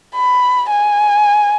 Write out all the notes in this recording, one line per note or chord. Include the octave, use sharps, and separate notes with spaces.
B5
G#5